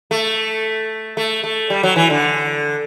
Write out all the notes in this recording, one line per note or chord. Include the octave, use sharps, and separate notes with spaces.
A3
A3
A3
G3
F#3
E3
D3